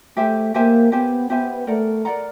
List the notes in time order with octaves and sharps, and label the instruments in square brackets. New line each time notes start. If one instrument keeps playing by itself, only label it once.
[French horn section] A3 [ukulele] G4 C5 E5 G#5
[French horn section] A#3 [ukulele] G4 C5 E5 G#5
[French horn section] B3 [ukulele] G4 C5 E5 G#5
[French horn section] B3 [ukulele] G4 C5 E5 G#5
[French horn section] A3 [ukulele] A#4 D5 F#5 A#5
[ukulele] A#4 D5 F#5 A#5